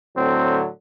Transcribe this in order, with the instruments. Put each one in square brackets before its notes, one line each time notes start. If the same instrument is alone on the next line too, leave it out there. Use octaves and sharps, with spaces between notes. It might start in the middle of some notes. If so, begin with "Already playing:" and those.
[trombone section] A2 D3 F#3 [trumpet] C4